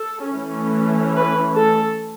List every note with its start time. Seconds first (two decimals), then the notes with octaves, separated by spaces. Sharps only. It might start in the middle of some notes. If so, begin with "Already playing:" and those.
Already playing: A4
0.31 E3 A3 C#4
1.15 B4
1.57 A4